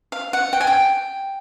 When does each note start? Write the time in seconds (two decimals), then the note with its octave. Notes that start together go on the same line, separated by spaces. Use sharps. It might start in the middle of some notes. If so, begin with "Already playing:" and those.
0.12 F5
0.33 F#5
0.53 G5
0.61 G#5
0.67 G5